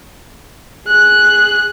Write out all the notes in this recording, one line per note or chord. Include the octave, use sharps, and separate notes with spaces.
G#4 F#6